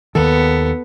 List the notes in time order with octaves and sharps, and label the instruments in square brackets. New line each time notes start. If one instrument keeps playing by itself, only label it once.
[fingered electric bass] D#2 D#3 [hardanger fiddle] B3 [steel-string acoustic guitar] A4